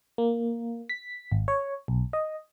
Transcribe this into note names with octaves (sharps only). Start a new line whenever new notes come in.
A#3
B6
G#1
C#5
B1
D#5